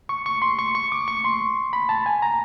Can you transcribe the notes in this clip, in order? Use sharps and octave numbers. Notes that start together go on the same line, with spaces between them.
C#6
C#6
C6
C#6
C#6
D6
C#6
C6
B5
A5
G#5
A#5